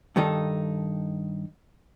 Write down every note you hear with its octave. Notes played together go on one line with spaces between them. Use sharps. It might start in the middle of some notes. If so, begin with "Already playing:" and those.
G2 D#3 D#4 A4